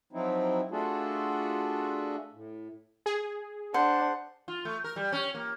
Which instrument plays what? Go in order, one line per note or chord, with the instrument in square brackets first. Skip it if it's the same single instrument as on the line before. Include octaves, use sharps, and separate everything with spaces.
[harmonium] F3 F#3 C4 D#4 E4
A3 D4 F4 F#4 G#4 A4
A2
[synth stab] G#4
[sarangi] D4 [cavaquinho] C5 [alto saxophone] F#5
[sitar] F4
A3
A#4
G3
C#4
A#3